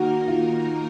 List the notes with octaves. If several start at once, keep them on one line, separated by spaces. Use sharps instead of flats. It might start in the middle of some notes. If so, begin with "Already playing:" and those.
Already playing: D#3 A#3 D#4 F#4 A#4
F4